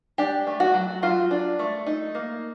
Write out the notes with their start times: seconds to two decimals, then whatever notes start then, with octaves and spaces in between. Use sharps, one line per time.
0.18 D4 G4
0.47 A3
0.60 F#4
0.74 F#3
1.02 F#3 F4
1.31 D4
1.59 A3
1.86 D#4
2.15 A#3